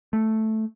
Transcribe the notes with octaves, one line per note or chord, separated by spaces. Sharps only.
A3